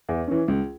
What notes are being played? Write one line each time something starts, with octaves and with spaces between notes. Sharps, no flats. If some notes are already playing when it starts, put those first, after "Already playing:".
E2
E3 C#4
C#2